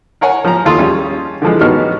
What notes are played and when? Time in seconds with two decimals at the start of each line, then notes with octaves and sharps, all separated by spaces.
0.21 A#4 C#5 F#5 G#5
0.44 F3 A#5
0.65 D#2 F4 A4 C6 D#6
0.78 G3 C#4 F4 G#4
1.42 D3 E3 F3 G#3
1.61 A1 D#3 B3 D#4 F#4 F6